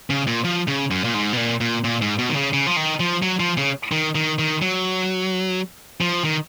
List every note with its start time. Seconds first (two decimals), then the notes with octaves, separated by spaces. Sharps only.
0.10 C#3
0.27 A#2
0.44 F3
0.68 C#3
0.91 F#2
1.04 A#2
1.14 G#2
1.33 B2
1.37 A#2
1.61 A#2
1.84 A#2
2.02 G#2
2.19 B2
2.29 D#3
2.36 C#3
2.53 C#3
2.67 F3
2.76 D#3
3.00 F3
3.22 F#3
3.40 F3
3.57 C#3
3.92 D#3
4.15 D#3
4.39 D#3
4.62 F#3
6.01 F3
6.24 D#3